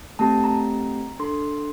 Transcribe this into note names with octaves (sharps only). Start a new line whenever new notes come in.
A3 C4 G4 A5
A#5
D4 A4 C6